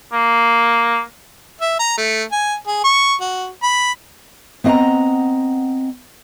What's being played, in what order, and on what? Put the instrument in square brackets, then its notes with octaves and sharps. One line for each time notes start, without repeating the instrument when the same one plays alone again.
[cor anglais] A#3
[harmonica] E5
A#5
A3
G#5
G#4
C#6
F#4
B5
[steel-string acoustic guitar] B3 C4 D#5 F5 F#5 A#5